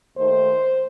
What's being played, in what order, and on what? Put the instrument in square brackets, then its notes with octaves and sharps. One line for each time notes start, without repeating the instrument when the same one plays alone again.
[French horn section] D#2 D#3 A3 D#4 C5